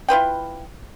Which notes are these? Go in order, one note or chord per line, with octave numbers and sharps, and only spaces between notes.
E4 F4 B4 G5